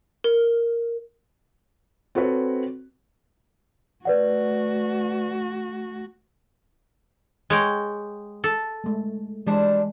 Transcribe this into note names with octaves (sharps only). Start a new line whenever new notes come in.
A#4
C4 F#4 A4 B4 C#5
A3 F#4 B4 D5 F#5
G#3 C#5 G5
A4
G#3 A3
E3 G3 G#3 D4 C5